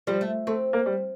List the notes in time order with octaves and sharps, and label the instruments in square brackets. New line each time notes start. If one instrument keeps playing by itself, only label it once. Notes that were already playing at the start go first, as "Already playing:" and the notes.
[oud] F3 [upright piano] G3
[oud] A3
[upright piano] A3 [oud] C4
[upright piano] A#3
G3